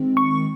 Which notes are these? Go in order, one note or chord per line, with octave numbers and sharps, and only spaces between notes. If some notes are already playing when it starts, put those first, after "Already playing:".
Already playing: D#3 G#3 C4
C#6